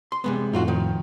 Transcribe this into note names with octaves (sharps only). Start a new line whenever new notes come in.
C6
C3 G#3 B3
F2 A2 D#4 F4 F#4
D#3 F3